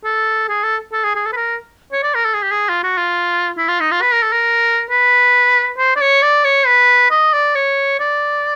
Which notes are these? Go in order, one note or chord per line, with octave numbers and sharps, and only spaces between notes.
A4
G#4
A4
A4
G#4
G#4
A4
B4
A#4
C#5
D5
A#4
A4
G#4
G4
G#4
F4
F#4
F4
E4
F4
D#4
F4
B4
A#4
A4
A#4
B4
C5
D5
C#5
D5
C#5
B4
D#5
D5
C#5
D5